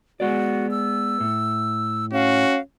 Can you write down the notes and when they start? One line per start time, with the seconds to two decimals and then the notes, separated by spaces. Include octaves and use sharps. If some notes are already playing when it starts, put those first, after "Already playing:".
0.20 G#3 B3 F#4 D5
0.71 E6
1.20 A2
2.13 C#4 F#4 F5